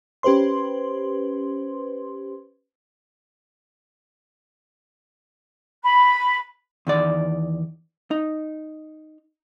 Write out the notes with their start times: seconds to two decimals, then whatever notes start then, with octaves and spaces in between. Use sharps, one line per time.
0.23 C#4 G4 B4 C5 C6
5.83 B5
6.87 E2 D#3 D5
8.11 D#4